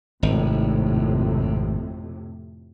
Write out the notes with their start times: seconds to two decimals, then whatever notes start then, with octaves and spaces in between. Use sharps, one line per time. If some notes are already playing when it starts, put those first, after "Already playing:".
0.23 G#1 F2 A2 C3